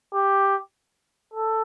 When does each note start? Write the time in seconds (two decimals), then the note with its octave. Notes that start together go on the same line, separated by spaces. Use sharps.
0.14 G4
1.34 A4